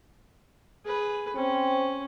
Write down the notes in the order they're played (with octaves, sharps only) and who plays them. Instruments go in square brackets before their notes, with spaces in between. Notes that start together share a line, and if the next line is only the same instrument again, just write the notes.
[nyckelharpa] G#4 B4
[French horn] C4 [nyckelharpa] C#4